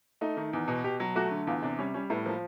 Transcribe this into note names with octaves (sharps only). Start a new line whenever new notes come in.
A3 D#4
D#3
E2
B2
B2 G4
F#3
A3 F#4
D3
E2 F4
C3 D4
G3 C#4
G3 C#4
A2 B3
F3 A#3